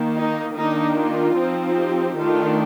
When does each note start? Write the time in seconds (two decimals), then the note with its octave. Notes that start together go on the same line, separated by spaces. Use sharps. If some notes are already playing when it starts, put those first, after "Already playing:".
Already playing: D#3 A#3
0.17 D#4
0.56 D#3 A#3 D4 D#4
0.97 F4
1.36 F3 C4 D#4
1.77 G4
2.17 D#3 A3 D4 F4